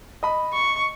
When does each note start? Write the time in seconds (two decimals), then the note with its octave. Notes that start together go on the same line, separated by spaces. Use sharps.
0.23 D#5 B5
0.53 C#6